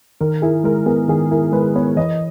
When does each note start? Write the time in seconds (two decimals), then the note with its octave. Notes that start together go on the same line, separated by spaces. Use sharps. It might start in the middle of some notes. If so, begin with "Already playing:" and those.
0.21 D#3 A#4
0.42 E4 G#4
0.64 G#3 A#4
0.86 B3 G#4
1.08 D#3 G#4
1.31 E4 A#4
1.52 G#3 B4
1.75 B3 C#5
1.97 E3 D#5